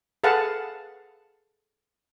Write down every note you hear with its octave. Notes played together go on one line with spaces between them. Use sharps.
G#4 A4 B4 F5 F#5 A5